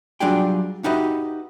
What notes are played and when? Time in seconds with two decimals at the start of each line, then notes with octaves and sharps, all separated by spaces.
0.20 F#3 G3 D4 F4 G#4 G5
0.84 D#4 F#4 G4 B4 D#5 E5